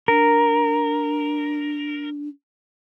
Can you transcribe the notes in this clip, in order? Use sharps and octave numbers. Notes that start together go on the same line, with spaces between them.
D4 A#4